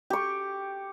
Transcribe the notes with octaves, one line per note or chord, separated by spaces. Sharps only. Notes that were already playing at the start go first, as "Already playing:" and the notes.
G4 C#6